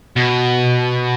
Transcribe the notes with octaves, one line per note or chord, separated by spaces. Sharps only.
B2